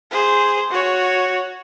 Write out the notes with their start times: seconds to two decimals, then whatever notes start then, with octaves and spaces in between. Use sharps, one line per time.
0.11 G#4 C5
0.71 F#4 C#5